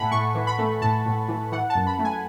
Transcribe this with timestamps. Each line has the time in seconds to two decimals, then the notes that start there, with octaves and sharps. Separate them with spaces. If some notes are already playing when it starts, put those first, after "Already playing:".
Already playing: A2 A3 E5 F#5 G#5 A5 B5
0.11 A2 C#6
0.35 E3
0.47 B5
0.59 A3
0.82 A2 A5
1.05 A2
1.28 E3
1.52 E3 F#5
1.70 A5
1.75 F#2
1.87 B5
1.99 A3
2.05 G#5